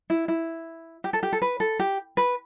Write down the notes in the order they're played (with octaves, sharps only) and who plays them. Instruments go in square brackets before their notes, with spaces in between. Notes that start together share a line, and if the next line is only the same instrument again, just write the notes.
[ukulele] E4
E4
G4
A4
G4
A4
B4
A4
G4
B4